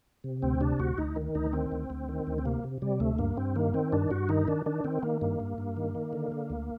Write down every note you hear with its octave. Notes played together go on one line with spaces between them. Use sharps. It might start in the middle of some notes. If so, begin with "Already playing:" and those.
C3
D2 C4
C3 D4
D2 F#4
D2 D#4
D#3
D2 D#4
D#3 C4
D2
D2
D#3
D2
C4
C3 A#3
C3
C3 G3
D2 A3
G2 A#3
G2 C4
D#3 A#3
D#3 C4
G2 D4
G2 F#4
D#3 D#4
D#3 D4
D#3 D4
D#3 C4
D#3 A#3
G2 A#3
G2
G2
D#3
D#3
D3
D3
D2